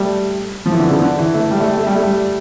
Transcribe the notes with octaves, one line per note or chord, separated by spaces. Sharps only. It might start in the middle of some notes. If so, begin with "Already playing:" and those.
Already playing: G3 A3
F3
E3
D3
C#3
D3
E3
A3
G3
A3
G3
A3
G3
A3
G3